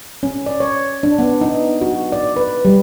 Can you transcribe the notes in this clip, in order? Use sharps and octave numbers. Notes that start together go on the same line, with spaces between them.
C#4
D5
C#5
D4
B3
D#4
F#4
D5
B4
G3